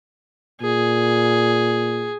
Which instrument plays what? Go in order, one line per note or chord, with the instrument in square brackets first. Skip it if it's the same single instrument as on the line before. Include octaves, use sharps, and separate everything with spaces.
[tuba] A#2 [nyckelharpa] G#4